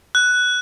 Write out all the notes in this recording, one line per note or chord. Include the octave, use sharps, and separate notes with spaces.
F#6